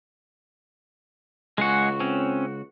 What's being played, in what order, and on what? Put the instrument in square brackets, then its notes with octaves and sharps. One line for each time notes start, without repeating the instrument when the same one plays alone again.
[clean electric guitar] C#2 F#4 [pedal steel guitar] G#3 G#4 F#5
[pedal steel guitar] C4 C#4